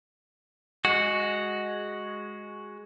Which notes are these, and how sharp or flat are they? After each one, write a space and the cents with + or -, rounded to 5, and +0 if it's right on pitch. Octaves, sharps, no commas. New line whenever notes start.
G#3 +0 F#4 +0